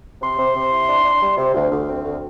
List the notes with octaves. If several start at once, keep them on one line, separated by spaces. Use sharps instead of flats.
C3 C6
C3
C3
E4
D4
D4
G3
C3
D2
D2
C4
D2